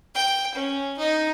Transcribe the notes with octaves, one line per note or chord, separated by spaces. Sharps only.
G5
C#4
D#4